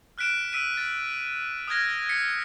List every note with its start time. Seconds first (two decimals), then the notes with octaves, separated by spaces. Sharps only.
0.18 F6 F#6 B6 D7 E7
0.53 E6 B6 D7 D#7
0.77 A6
1.68 D#6 F6 F#6 G#6 A#6
2.09 B6 C#7